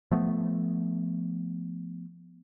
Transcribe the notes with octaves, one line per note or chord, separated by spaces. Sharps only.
F3 A3 B3